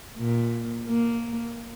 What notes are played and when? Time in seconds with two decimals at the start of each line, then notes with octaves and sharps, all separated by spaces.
0.19 A#2
0.88 A#3